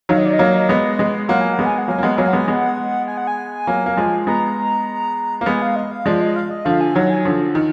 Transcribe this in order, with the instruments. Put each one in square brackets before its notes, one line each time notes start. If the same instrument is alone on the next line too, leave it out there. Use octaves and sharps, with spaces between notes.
[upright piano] D#3 F#3 [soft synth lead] F5
[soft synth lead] D#5
D5
D#5
[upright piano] F#3 A#3
G#3 B3
G#3 B3
[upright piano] F#3 A#3 [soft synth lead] F#5
[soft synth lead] G#5
F#5
[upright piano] G#3 B3
[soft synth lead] G#5
F#5
[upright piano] F#3 A#3 [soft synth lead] G#5
[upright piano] A#3
[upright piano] G#3 B3 [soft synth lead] F#5
[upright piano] F#3 A#3 [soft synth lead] G#5
[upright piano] G#3 B3 [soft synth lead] F#5
[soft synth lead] G#5
[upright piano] G#3 B3
[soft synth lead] F#5
G#5
F#5
G#5
[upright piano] F#3 A#3
A#3
F3 G#3
[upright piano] G#3 B3 [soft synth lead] A#5
[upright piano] A#3
[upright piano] G#3 B3 [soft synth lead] G#5
[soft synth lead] F5
D#5
F5
[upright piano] F3 G#3 [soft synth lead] D5
[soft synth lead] D#5
F5
D#5
[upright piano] D3 F3 [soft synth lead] F5
[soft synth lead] G#5
[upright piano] D#3 F#3 [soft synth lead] F#5
[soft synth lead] G#5
[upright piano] D3 F3
D#3